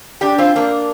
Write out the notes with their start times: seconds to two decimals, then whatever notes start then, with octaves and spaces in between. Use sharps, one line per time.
0.21 D4 G4
0.38 C4 F4
0.56 A#3 D4